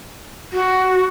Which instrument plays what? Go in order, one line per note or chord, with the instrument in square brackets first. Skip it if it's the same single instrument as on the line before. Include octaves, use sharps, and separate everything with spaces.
[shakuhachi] F#4